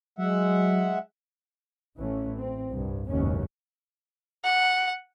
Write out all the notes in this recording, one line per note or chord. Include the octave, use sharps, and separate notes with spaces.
F#3 G#3 E5 F#5
A1 E3 A3 C#4
C4
C2 G2
F#1 D#2 G#2 B2 E3 C#4
F#5